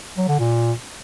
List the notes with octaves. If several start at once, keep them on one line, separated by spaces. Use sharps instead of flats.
F#3
D3
A#2